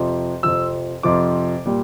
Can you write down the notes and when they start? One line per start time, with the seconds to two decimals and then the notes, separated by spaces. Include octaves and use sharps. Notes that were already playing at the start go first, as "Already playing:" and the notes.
Already playing: F2 C3 F3
0.43 F2 C3 F3 E6
1.03 F2 C3 F3 D6
1.65 A#2 G3